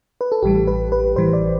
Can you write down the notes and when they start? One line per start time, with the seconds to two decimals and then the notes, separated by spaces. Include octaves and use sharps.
0.21 B4
0.32 A4
0.43 A1 A2 E3 G3 G4
0.67 B4
0.92 B4
1.16 A1 A2 E3 G3 C5
1.33 D5